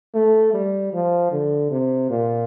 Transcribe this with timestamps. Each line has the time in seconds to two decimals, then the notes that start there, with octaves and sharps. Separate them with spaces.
0.14 A3
0.54 G3
0.93 F3
1.32 D3
1.71 C3
2.10 A#2